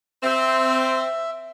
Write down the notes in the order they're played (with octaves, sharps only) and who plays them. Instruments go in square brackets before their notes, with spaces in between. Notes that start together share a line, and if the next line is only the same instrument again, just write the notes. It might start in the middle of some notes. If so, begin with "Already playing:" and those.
[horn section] C4 [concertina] E5